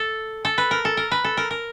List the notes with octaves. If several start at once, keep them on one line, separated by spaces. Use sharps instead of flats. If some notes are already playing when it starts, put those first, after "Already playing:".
Already playing: A4
A4
B4
A#4
A4
A#4
B4
A4
A#4
A#4